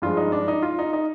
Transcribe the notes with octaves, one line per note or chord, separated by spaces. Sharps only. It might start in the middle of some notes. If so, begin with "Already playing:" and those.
G2 F3 G#3 F4
D#4
D4
D#4
F4
D#4
D#4